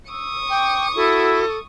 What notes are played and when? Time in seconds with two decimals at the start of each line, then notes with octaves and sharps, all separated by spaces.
0.11 C#6 D#6 E6
0.50 G5 D6
0.96 E4 F#4 A4